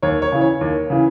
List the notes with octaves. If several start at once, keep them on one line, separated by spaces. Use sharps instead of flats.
D#2 C#5
C#5
C#3 E3
C#5
D#2
C#3 E3